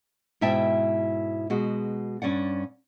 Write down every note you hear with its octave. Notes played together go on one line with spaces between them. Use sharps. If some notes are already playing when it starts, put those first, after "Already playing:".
G#2 B2 E4 E5 G5 A5
B2 G#3 F#4
G2 C#4 D5 F#5